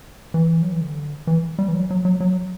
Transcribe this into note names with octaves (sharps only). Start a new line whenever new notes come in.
E3
F#3
E3
D3
E3
G3
E3
F#3
F#3
F#3
F#3